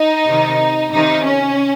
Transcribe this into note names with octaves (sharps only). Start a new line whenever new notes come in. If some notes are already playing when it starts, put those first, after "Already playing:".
Already playing: D#4
C3 D#3
C3 D#3 D#4
C#4